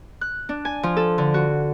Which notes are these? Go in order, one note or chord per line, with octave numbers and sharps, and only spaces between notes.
F#6
D4
G#5
F3
A4
D3
F#4